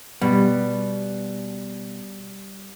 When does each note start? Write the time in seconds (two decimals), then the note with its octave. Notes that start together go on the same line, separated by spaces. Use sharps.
0.21 B2 G3